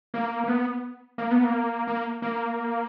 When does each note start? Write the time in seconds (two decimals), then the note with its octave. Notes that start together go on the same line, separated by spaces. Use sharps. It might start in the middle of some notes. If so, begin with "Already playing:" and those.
0.14 A#3
0.44 A#3
0.48 B3
1.18 A#3
1.31 B3
1.44 A#3
1.87 A#3
2.22 A#3